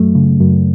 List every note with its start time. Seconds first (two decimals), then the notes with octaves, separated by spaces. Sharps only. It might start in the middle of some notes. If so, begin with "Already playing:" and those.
Already playing: F#2 F#3 A3
0.15 C#3
0.40 F#2